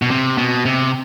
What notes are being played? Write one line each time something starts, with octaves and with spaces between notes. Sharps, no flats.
B2
C3
B2
C3